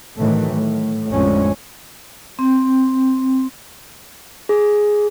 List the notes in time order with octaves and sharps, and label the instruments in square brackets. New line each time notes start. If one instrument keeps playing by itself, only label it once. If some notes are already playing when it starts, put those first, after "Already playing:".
[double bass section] A2 D#3 E3 F#3 A3
A2
A1 F2 D3 G#3 C#4
[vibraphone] C4
[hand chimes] G#4